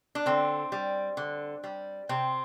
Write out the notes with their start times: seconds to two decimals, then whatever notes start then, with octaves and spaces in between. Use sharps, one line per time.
0.15 D4
0.26 D3 C4
0.72 G3
1.17 D3
1.64 G3
2.09 C3 C4